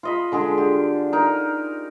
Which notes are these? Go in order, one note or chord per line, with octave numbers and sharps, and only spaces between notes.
F4 D#5 B5
D3 G#3 D4 G#4
G4
D#4 A#4